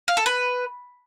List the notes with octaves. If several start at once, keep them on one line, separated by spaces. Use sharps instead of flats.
F5
A4
B4